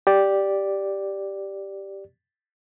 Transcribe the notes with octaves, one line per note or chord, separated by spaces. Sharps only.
G4 D5